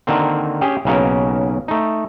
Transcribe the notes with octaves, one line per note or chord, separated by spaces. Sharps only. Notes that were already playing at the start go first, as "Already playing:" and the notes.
D3 D#3 A#3 C4
C#4 G4 G#4 G5
B1 C#3 A#3 B3 C#4 A#4
A3 D#4